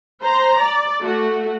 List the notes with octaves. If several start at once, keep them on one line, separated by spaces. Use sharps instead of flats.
C5 A#5
D5
A3 F#4